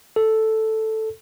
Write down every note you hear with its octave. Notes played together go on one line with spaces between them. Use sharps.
A4